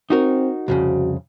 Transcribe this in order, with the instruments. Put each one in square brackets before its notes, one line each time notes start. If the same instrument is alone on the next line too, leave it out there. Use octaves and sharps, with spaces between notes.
[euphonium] C4 [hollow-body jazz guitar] D#4 F#4 A#4
[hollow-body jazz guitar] C2 F2 C#3 [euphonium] F#4